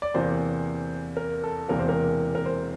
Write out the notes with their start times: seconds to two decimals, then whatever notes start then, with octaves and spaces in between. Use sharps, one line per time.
0.02 D5
0.14 E2 C3 E3 A#3 C5
1.17 A#4
1.44 A4
1.68 E1 E2 C3 E3 A#3 A#4
1.79 C5
1.89 A#4
2.35 A#4
2.46 C5